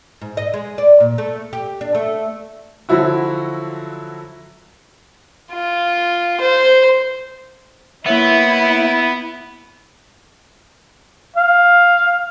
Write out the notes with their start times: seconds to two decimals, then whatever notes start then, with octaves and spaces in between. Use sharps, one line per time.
0.21 G#2
0.37 D#5
0.54 G#3
0.78 D5
1.00 A#2
1.18 A3
1.53 G4
1.81 D4
1.95 A3
2.89 D3 F3 F#3 E4 F#4
5.52 F4
6.41 C5
8.06 A#3 B3 E4 C#5 E5
11.36 F5